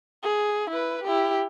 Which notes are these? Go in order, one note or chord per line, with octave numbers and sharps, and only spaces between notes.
G#4
E4 B4
E4 G4